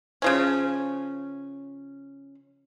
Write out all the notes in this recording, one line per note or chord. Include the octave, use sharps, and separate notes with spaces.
C#3 F3 C#4